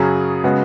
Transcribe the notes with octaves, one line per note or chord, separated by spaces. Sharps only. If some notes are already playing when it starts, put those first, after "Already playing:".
Already playing: F#2 C#3 F#3 C#4 G#4
C#3 G#3 B3 F#4